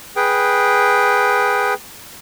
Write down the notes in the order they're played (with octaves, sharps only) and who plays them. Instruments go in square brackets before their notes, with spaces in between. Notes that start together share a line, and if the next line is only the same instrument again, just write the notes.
[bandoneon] G#4 B4 G5